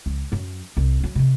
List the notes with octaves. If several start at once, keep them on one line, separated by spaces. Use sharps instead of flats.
C#2
F#2 F#3
C2
F#3 G3
C3 D#3